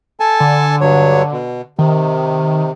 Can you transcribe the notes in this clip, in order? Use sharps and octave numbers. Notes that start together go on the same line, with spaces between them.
A4 G#5 A5
D3
G2 F#3 C#5
B2
C3 D#3